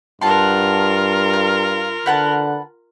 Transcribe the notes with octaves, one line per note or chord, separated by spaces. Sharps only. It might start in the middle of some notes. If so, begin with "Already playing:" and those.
G2 F4 A#4 F#5 A5 C6
F5
D3 B4 F#5 A5